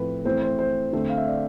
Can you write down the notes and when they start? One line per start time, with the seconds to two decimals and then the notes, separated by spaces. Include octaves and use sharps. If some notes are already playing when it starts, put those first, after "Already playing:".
Already playing: A2 F3 A3 C4 B4
0.25 E3 A3 C4 C5
0.42 C5
0.59 C5
0.93 D3 A3 C4
1.10 F5
1.17 E5
1.27 D5